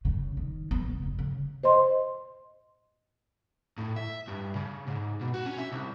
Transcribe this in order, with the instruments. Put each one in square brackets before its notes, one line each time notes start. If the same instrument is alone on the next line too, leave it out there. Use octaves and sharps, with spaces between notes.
[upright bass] C#3
D#3
B3
C#3
F#1
C#3
[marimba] C5 D#5 C6
[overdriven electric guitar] A2
E5
G2
C#3
G#2
B2
F#4
C#4
E5
C2